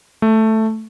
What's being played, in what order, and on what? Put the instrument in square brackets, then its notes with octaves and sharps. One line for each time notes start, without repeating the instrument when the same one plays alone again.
[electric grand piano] A3